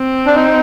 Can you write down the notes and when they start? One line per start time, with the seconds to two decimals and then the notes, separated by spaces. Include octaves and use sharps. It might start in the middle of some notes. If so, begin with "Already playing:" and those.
Already playing: C4
0.26 D4
0.35 D#4